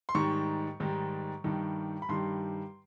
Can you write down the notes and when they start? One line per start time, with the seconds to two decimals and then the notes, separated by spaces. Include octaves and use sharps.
0.09 C6
0.15 G#2 D#3 G3 C#6
0.80 G#2 D#3 G3
1.44 G2 D#3 G3
2.02 B5
2.09 G2 D#3 G3 C6